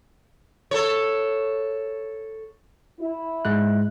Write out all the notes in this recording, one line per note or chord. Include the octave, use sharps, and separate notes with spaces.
A4 C#5
E4
G#2 G#3 F#6